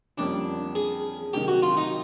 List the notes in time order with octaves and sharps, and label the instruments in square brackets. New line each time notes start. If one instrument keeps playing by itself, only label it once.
[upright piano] F2 D3 G3 A#3 C#4 [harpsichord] D4
[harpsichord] G#4
[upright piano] C3 D#3 F#3 [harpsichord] G4
[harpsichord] F#4
F4
D#4